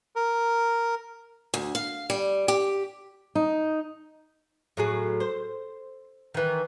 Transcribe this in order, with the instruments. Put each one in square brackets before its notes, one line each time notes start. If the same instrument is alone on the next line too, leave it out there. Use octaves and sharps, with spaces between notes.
[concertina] A#4
[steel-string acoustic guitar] D2
F5
G3
G4
D#4
[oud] A2 F#3 G#4
C5
D#3 E3